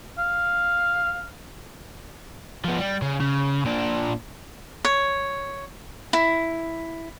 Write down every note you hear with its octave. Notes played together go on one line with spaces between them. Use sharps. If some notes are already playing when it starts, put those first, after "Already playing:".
F5
F3 B3
G3
C#3
C#3
A#2 D4
C#5
E4